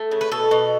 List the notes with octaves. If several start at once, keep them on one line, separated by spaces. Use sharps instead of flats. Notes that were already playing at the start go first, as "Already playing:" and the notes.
Already playing: A3
C#3
B4
B2 A4
B2